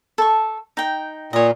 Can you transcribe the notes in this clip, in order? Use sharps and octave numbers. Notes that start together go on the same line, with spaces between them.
A4 C#6
D#4 G5
A#2 C#5 D#5